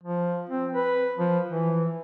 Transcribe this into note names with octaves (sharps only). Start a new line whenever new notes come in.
F3
C4
B4
F3
E3